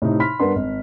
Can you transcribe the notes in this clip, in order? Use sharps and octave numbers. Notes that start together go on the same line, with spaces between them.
A2 C3 D#4
B5 C6 F6 B6
G2 B3 D4 A#4 C6
G#1